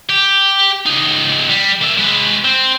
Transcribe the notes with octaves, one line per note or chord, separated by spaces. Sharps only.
G4
C#2 D#4
G3
A#3 E5
G#3 B4
C4